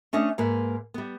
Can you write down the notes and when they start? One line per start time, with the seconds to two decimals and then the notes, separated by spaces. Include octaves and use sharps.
0.13 A3 C#4 D4 D#5
0.38 G#2 A#3 B4
0.94 G3 B3